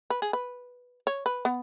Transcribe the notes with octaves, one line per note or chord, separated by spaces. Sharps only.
B4
G#4
B4
C#5
B4
B3